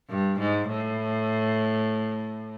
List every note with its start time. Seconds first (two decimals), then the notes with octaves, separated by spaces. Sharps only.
0.09 G2
0.39 G#2
0.69 A2